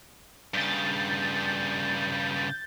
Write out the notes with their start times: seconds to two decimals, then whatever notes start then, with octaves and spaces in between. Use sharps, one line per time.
0.54 G2 C#3 G6 A6